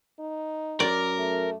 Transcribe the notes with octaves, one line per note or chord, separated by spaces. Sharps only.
D#4
F#2 A#4 D5
A3